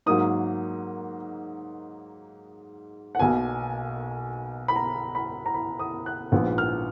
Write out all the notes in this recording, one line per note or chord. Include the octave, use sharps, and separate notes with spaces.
G#2 F#3 A#3 D#4 D#6
F#5
B1 B2 A#3 G#5
B5
A#5
B5
A#5
B5
D#6
F#6
A#1 G#2 F3 B3
F6